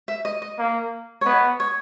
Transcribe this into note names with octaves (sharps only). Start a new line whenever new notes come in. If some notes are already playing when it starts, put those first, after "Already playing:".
E5
D#5
D#5
A#3
C#5
B3 D#5
C#5